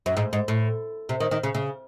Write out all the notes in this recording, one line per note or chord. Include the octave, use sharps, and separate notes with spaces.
F#2
G#2
G#2
A2
C3
D#3
D#3
C#3
C#3